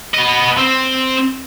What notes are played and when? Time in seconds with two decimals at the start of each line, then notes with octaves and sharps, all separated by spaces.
0.14 B3 D#5
0.57 C4